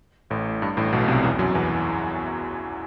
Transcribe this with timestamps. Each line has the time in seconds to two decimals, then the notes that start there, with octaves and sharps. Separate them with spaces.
0.30 A1 A2
0.62 G2
0.77 A1 A2
0.93 B1 B2
1.08 C2 C3
1.24 E2 E3
1.39 F#2 F#3
1.55 E2 E3